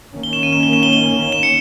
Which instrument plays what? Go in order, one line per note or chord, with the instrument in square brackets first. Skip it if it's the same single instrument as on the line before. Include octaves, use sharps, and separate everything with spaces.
[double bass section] D#3 A#3 C#4
[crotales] G7
E7
D#7
E7
G7
E7
G7
G7
E7
C#7